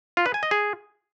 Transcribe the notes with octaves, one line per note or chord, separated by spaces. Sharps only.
F4
B4
G#5
D#5
G#4